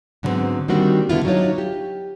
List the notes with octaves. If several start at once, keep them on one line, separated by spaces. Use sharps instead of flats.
G#2 D3 F#3 G3 B3 C4
D#3 G3 A#3 C4 D4 F#4
D3 B3 E4 F4
F#3 D4 D#4 F4 C#5
G4